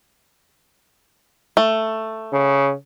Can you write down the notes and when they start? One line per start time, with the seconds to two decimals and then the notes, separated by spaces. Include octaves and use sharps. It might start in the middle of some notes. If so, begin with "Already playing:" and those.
1.57 A3
2.32 C#3